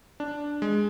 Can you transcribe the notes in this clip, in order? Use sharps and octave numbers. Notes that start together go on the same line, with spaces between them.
D4
G#3